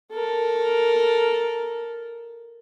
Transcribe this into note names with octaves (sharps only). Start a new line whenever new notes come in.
A4 A#4